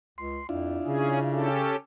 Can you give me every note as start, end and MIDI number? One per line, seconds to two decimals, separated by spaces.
0.18 0.39 37
0.18 0.47 84
0.49 0.79 41
0.49 1.49 62
0.49 1.49 64
0.49 1.49 65
0.87 1.74 49
0.87 1.19 61
0.87 1.19 68
1.32 1.76 61
1.32 1.76 67
1.32 1.76 69